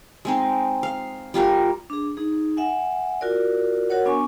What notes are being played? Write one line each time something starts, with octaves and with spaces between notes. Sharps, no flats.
G#3 C4 D#4
F5
G3 F4 A#4 F5
D4 G#4
D#4 G#4
E5 F#5 G#5
F4 F#4 A#4 D5
F#4 A#4 C#5 F#5
B3 D4 G#5 C#6